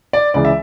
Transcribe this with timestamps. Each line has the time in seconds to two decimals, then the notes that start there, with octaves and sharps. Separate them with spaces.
0.13 D5
0.34 C#2 C#3 E3 D5
0.45 E5